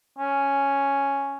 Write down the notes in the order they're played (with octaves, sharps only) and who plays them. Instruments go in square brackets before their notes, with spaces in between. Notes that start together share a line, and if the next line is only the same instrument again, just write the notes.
[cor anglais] C#4